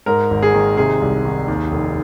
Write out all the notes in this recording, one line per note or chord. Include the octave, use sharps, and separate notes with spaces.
G#2 A#4
G#1
G#4
D#3
C3 G#4
C2
D#3
D#2
F1